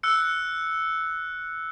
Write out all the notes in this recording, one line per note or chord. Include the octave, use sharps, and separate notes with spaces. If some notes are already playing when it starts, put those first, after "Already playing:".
E6 F#6 C#7